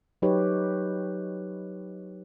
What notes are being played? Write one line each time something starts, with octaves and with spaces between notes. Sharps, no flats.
F#3 D#4 G4 B4 C#5